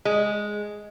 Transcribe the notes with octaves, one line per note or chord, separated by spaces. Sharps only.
G#3